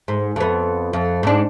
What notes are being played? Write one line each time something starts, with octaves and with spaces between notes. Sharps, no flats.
G#2
F2 B3
F2
G#2 D4